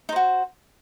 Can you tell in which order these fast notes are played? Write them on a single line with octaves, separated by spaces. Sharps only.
D#4 C5 F#4